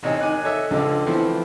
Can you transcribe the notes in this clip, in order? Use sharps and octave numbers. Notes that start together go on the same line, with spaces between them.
A1 C3 D#4 C#5 D#5 G#5
D#3 G#5 D6 F#6
A4 C#5 D#5 E5
C#2 D3 F3 A4 D#5 D6
E3 F3 A3 B3 C4 E4